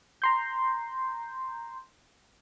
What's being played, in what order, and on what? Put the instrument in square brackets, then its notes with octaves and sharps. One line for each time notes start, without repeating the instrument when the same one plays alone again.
[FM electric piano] A#5 C6 G6